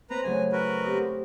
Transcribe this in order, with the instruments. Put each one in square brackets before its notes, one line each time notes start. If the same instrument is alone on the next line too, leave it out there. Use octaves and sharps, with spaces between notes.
[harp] C4 C5 [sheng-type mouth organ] B4 A#5
[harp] A2 C#3 F#3 [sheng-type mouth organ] G#5
[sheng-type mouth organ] F#4 A#4 B4
[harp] C4 G4 D#5